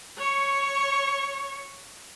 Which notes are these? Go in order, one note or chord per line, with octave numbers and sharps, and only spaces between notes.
C#5 C#6